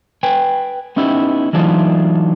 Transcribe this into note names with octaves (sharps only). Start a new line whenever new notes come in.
B4 G5 G#5
B3 C#4 D#4 E4 G4
E3 F#3 A3 D4 D#4 F4